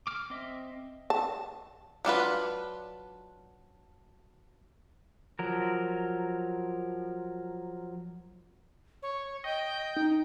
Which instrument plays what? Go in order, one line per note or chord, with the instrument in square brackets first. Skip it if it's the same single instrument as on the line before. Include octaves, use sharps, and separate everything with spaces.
[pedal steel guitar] D6 F6
C4 D#5 E5
[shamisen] A5
[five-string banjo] F#3 D4 F4 B4
[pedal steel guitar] F3 F#3 A#4
[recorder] C#5
[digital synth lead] D#5 [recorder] G5
[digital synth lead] D#4